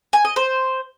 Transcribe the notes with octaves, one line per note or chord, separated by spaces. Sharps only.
G#5
D#5
C5